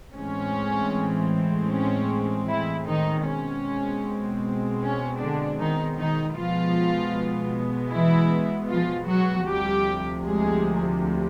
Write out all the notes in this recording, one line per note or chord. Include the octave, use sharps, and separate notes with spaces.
A2 E3 G#3 C4 C#4
C#4
E3 E4
D#3 D#4
B2 G#3 C4 C#4
C#4
D3 D4
D#3 D#4
D#3 D#4
B2 F3 G#3 B3 F4
E3 E4
F3 F4
F#3 F#4
D2 C3 F3 G3 G4
G#3 G#4